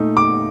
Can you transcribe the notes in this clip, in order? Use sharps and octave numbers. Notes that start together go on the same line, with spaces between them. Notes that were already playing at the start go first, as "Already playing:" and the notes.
Already playing: A#2 A3 D#4
D6